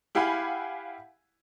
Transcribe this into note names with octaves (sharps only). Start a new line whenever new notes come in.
E4 G4 F5 F#5 G#5 B5